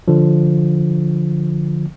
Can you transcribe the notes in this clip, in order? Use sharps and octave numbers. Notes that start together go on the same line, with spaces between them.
D3 F3